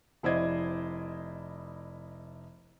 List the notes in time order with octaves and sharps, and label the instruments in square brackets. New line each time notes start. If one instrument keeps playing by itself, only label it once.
[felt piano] F1 E4 C5 D5 D#5 G#6